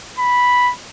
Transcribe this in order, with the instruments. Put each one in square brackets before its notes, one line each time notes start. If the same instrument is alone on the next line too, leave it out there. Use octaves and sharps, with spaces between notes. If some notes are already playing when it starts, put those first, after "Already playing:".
[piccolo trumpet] B5